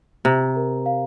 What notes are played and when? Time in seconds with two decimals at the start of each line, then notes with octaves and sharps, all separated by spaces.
0.25 C3 A#5
0.56 A#4
0.86 F5